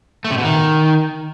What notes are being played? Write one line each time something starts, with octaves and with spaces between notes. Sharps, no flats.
A3
C3
B2
D#3